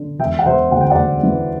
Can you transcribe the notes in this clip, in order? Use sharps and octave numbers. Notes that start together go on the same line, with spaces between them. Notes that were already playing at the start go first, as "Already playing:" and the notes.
Already playing: D3
E1 E5 G5
F#5
E1 C5 E5
D2 F#5
G5
D5 F#5
D2
E3